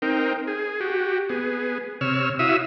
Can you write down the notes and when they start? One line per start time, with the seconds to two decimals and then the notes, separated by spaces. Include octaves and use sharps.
0.02 C4 D#4 A#4 G5
0.47 G#4
0.80 F#4 G4
1.29 B3 G#4
2.01 C3 C#5 E6 F6
2.39 E4 F#4 E5 F5 D#6 E6